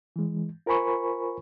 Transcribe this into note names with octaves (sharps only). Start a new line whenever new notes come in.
E3 G#3
F4 A#4 C5 G#5 B5 C#6